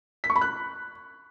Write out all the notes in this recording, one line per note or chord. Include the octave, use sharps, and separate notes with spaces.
B6
C#6
B5
F#6